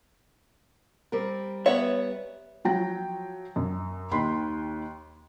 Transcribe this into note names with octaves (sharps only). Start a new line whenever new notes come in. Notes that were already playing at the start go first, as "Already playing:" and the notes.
G3 C4 A#4
B3 C#5 E5
F3 F#3 G5 A#6
F#2
D#2 D#3 B5 C6